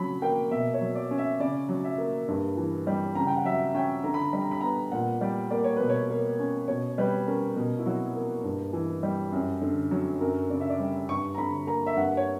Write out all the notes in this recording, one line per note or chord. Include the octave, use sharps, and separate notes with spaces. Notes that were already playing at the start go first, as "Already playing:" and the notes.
Already playing: C#3 F#3 B5
A#3 G5
B2 E5
C#5
F#3
D5
C#4
E5
C#3 D5
F#3
E5
A#3
G2
E3
G3
C#3 A#5
G5
F#5
F#3 E5
C#4 G5
D3 A#5
B5
A#5
G3 B5
A#5
B5
B3 A#5
A#2 F#5
G3 D5
A#3 D5
C#5
B2 B4
C#5
A#3
C#4
B2 C#5
G3 B4
C#4 A#4
B2 A#4
E4
F#3 F#4
A#3
G2
E3
G3
F#2
D3
F#3
F#2 A#4
C#3 D5
E5
D5
G3
G2 C#6
A#5
D3 B5
A#3 A#5
E5
G2 F#5
C#5